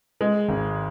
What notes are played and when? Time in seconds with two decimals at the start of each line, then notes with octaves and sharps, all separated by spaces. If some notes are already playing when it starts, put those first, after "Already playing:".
0.21 G#3
0.48 G#1